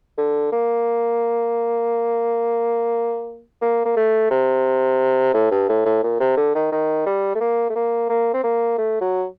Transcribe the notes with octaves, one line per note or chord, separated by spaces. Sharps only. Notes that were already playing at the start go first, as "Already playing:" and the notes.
D3
A#3
A#3
A#3
A3
C3
A2
G2
A2
A2
A#2
C3
D3
D#3
D#3
G3
A3
A#3
A3
A#3
A#3
C4
A#3
A3
F#3